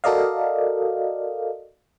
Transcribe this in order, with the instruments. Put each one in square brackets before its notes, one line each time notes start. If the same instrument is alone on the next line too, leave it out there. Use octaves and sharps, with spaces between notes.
[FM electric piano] F#4 A4 A#4 D5 D#5 F5